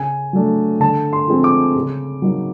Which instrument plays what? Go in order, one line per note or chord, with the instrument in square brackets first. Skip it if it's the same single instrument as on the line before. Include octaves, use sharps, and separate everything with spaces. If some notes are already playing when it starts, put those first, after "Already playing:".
Already playing: [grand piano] C#3 G#5
F#3 A3 D4
D3 A5
C6
F3 G#3 C4
D6
C#3
F#3 A#3 D#4